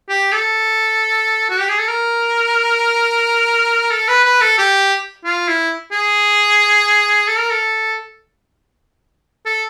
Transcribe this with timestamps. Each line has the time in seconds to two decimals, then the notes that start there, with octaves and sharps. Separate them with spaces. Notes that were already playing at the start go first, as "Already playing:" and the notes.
0.09 G4
0.32 A4
1.50 F#4
1.60 G4
1.69 G#4
1.79 A4
1.88 A#4
3.91 A4
4.08 B4
4.25 B4
4.41 A4
4.58 G4
5.25 F4
5.48 E4
5.92 G#4
7.28 A4
7.39 A#4
7.51 A4
9.46 A4